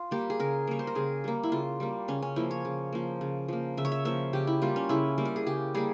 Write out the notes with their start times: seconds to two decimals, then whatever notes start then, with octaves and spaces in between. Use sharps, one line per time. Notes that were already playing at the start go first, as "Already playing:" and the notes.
Already playing: F4
0.11 G3 A#3 G4
0.30 G#4
0.39 C#3 A#4
0.67 G3 A#3 C#5
0.79 C5
0.87 A#4
0.95 C#3 G#4
1.24 G3 A#3
1.43 E4
1.52 C#3 F4
1.80 G3 A#3
2.08 C#3 C#4
2.22 C#4
2.36 F3 A#3 E4
2.51 C#5
2.65 C#3
2.93 F3 A#3
3.21 C#3
3.48 F3 A#3
3.77 C#3 E5
3.85 C#5
3.92 E5
4.05 F3 A#3 E5
4.33 C#3 G4
4.47 E4
4.62 G3 A#3 F4
4.76 C#4
4.89 C#3 E4
5.18 G3 A#3
5.25 A#4
5.36 G#4
5.46 C#3 G4
5.74 G3 A#3 G#4